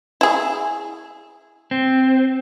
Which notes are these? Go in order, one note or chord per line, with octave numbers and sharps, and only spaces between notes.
E4 G#4
C4